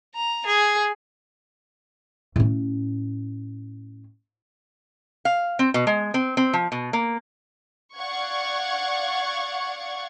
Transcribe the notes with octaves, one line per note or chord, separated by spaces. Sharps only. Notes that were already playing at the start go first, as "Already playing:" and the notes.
A#5
G#4
A2 C#4
F5
C4
B2
G#3
C4
C4
F3
B2
A#3
D5 F5 F#5 C#6 G#6